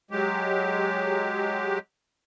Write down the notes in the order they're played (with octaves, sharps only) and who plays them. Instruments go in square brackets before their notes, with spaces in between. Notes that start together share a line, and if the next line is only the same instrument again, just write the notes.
[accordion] F#3 G#3 G4